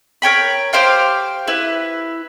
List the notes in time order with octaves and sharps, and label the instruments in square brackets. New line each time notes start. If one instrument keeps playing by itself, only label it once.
[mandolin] A#4 C#5 G5 B5
G4 C5 F5 G5
E4 B4